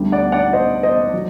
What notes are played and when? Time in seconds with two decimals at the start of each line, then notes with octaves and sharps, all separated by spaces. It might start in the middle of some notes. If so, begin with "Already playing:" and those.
Already playing: D2 D3 G3
0.12 D5 F#5
0.32 D5 F#5
0.53 C5 D#5
0.83 C5 D#5
1.14 F#3